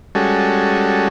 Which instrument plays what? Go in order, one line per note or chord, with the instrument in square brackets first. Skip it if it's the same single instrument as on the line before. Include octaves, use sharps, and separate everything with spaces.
[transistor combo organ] G3 G#3 C#4 F#4 A4